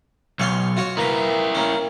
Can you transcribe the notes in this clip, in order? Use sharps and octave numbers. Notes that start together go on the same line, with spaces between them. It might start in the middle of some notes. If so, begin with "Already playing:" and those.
B1 C#5 F5 C6
F4 F#4 C#5
A#3 E4 A#4 B4
A#3 C#4